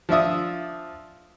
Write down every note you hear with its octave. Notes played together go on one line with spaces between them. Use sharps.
F3 D4 E5 D#6